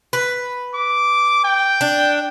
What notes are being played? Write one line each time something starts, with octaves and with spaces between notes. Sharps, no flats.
B4
D6
G5
D4